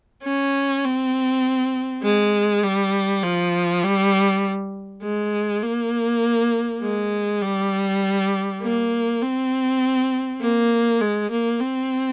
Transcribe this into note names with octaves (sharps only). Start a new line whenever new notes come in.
C#4
C4
G#3
G3
F3
G3
G#3
A#3
G#3
G3
A#3
C4
A#3
G#3
A#3
C4